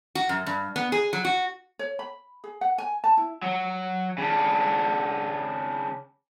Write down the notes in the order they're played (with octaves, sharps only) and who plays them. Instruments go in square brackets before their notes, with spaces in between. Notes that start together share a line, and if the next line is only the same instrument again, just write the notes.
[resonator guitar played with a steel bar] F#4
F#2
G2
B3
G#4
F#3
F#4
[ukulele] C#5
B5
G#4
F#5
G#5
A5
E4
[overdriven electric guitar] F#3
C#3 D4